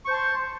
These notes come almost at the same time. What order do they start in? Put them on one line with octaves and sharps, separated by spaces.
C#6 C5 A5 C6